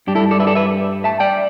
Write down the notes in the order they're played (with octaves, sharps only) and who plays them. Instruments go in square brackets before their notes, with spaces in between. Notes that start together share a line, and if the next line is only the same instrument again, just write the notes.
[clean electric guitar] G2 G3 D4 G4
E4 A4
A4 D5
B4 E5
A4 D5
B4 E5
E5 A5
D5 G5